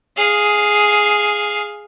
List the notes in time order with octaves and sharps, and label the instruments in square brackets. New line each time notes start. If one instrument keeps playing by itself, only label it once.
[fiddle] G#4 F5